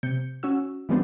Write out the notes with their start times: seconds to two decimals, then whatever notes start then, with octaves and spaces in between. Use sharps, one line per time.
0.03 C3 G6 C#7
0.43 C#4 F#4 E6
0.89 E3 G3 G#3 B3 C4 D4